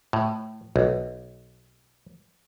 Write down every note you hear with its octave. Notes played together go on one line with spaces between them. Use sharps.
A2
B1